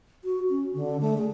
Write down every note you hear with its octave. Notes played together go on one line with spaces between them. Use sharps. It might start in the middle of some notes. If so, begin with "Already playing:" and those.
F#4
C#4
D3
A3
G#4